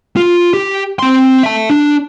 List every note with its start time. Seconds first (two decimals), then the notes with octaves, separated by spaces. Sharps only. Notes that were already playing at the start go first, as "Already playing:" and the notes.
0.16 F4
0.54 G4
0.99 C4 C6
1.43 E5 A5
1.70 D4